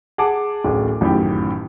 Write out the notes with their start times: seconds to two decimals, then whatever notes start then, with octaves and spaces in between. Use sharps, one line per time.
0.18 G#4 F#5 A5 D6
0.65 D1 A1 G#4
1.01 A1 F#2 A2 D#3 G4